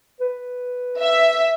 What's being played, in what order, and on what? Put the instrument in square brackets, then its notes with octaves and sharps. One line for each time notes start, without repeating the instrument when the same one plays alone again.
[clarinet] B4
[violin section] E5